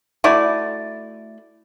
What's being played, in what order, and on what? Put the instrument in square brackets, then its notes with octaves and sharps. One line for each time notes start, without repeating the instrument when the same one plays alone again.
[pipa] A3 E4 F#4 D5